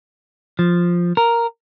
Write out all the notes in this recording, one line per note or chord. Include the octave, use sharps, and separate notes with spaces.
F3
A#4